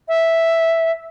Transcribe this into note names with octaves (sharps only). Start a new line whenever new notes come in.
E5